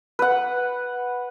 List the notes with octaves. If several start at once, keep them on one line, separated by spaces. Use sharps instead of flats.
B4 F#5